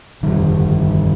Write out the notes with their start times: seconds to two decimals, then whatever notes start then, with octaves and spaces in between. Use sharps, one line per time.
0.22 G1 D#3 G3